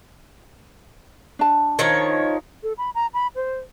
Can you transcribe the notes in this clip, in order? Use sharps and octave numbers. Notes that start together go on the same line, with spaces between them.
D4 A5
D#3 F3 C#5
A4
B5
A#5
B5
C5